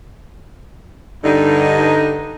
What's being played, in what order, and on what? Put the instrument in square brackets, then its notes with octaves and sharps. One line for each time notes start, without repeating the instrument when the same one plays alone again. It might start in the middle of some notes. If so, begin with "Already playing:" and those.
[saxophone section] G2 D3 [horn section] D#4